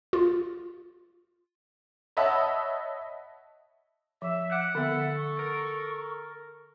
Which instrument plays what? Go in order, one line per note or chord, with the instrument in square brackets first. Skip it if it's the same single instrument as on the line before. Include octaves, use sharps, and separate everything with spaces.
[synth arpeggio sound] F4
[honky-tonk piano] C#5 D#5 E5 F#5 A5 B5
[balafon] F3 [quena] E5
[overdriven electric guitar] F#5 [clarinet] D6
[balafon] D3 B3 [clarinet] A4 [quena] E5
[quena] C#6
[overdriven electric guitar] A#4